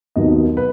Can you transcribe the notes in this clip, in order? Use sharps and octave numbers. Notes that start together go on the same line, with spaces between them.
D#2 D#3 F#3 B3 D#5
B4